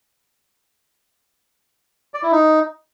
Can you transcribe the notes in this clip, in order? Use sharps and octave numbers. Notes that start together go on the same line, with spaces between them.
D5
E4
D#4